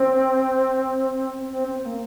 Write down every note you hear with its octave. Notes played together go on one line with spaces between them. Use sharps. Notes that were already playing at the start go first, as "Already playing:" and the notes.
Already playing: C4
C4
C4
A#3